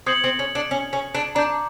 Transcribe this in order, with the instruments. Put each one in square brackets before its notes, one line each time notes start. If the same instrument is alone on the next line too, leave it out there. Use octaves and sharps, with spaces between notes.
[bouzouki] C4 [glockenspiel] D#6 G#6 C#7 F#7
[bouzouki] C4
C#4
D4
C#4
C#4
D4
[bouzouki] D4 [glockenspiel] A#5 D6 G6